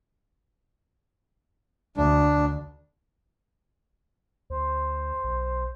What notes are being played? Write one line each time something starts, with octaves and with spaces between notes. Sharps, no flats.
D2 D4
D2 C5
B1